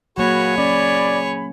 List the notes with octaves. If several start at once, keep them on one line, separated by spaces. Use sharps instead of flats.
F#3 A#3 F#4 G#4 C#5 G#5 B5
C#4 D5